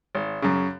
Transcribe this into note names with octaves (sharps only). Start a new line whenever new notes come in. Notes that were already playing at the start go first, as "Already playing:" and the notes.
G#1
F#2 C#3